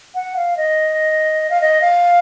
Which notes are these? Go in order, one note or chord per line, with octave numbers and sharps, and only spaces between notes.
F#5
F5
D#5
F5
D#5
F5